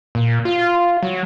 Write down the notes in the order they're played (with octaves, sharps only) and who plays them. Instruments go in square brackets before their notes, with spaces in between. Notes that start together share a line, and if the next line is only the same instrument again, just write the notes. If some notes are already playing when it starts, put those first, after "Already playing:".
[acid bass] A#2
F4
F#3